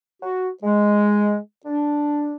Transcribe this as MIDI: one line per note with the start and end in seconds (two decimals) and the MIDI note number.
0.22 0.48 66
0.62 1.36 56
1.64 2.36 62